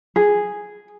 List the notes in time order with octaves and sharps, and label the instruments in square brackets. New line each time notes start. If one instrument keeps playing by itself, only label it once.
[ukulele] G#4